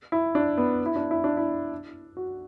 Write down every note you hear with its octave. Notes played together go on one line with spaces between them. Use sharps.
E4
D4
B3
E4
D4
E4
D4
E4
F#4